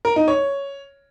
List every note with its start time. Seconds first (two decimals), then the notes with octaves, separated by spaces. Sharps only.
0.05 A#4
0.16 D#4
0.28 C#5